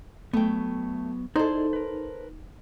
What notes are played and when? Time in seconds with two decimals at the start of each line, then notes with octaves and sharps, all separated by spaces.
0.33 F#3 A3 B3 G5
1.36 D#4 E4 G#4 A4 C5 D5
1.73 A#4 B4